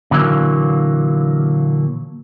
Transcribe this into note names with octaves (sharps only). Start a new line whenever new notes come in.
A#2 D3 E3 F#3 A#3